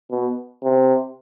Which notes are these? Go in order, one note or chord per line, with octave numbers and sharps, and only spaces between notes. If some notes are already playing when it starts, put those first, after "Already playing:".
B2
C3